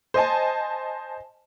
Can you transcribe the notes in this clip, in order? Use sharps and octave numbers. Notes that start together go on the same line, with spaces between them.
C5 D#5 G#5 A5